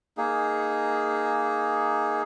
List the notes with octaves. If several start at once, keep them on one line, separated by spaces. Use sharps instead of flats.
A#3 D#4 G#4